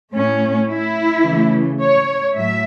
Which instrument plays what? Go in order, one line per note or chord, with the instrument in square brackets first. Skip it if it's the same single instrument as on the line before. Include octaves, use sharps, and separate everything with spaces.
[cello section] A2 A3 C#4
E4
C#3 E3 A3
C#5
A2 F#3 E5